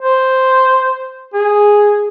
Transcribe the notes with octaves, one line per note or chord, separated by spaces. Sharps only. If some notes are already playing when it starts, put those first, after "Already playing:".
C5
G#4